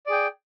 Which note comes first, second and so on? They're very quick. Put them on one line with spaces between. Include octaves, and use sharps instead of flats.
D5 G#4 G5